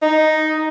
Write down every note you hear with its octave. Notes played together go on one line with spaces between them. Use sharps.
D#4